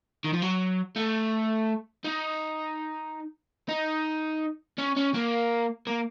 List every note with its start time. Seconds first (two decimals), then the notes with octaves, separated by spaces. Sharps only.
0.24 D#3
0.33 F3
0.42 F#3
0.96 A3
2.05 D#4
3.69 D#4
4.78 C#4
4.96 C#4
5.14 A#3
5.87 A#3